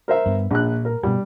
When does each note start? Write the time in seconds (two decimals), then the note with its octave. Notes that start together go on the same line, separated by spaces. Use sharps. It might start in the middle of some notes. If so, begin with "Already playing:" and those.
0.08 A#4 C5 E5
0.26 G2 B3
0.51 A#1 A#2 F#6
0.85 A#4
1.03 G2 B2 G3